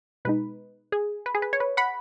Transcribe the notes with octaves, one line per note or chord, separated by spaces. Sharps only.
B2 G#3 D#4 B4
G#4
B4
G#4
B4
C#5
B4
F#5 B5